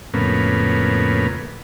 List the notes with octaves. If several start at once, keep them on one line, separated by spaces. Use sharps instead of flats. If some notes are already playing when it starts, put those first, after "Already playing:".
F2 A2 C#3 A#3 B3